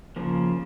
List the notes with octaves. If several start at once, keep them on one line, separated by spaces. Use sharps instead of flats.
C#3 F3 A#3